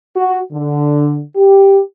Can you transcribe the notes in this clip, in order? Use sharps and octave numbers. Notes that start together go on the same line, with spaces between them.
F#4
D3
G4